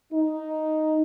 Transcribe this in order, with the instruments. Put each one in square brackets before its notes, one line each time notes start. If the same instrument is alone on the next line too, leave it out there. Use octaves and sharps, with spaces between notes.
[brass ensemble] D#4